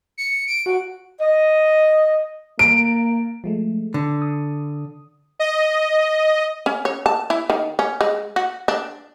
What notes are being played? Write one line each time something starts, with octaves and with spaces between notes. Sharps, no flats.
C#7
D7
F#4
D#5
A#3 D7
F3 G#3 A3
D3
D#6
D#5
C#4
C#5
A5
E4
D#3
C#4
G#3
F#4
D4